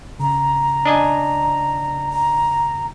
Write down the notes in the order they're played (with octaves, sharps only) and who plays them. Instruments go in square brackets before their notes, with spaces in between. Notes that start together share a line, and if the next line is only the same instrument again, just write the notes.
[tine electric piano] C#3 [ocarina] A#5
[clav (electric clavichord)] D4 D#5 G#5
[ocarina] A#5